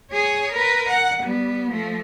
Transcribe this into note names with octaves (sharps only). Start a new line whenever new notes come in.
G#4 C#5
A#4 B4
F#5
G3 B3
F3 A3